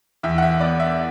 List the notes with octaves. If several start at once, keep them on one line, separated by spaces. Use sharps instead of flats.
E2 E5
F#5
E5
B3 D5
E5